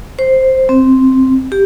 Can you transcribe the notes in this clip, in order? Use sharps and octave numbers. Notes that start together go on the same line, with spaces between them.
C5
C4
G4